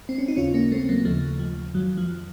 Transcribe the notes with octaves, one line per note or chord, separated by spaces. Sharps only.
C4
C#4
D#4
D#2 C#3 C#4 F4
A#3 C#4
A3 C4
F#3 A#3
D#2 C#3 F3 A3
F3
F2 D#3 F#3
F3